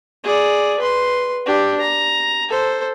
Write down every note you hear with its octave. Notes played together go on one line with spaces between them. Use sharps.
G#4 D5
B4 C6
D4 G4
A#5
A4 C5